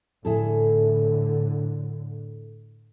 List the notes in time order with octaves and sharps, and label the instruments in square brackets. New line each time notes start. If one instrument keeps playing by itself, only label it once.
[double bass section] A2 D3 [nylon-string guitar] E4 G#4 A4